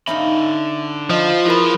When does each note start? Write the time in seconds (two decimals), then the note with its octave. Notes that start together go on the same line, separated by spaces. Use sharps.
0.08 D3 C#4 D#4 E5 F5 B5
1.10 F3 F4 D#5
1.46 E4 G#4 A#4 B4 B5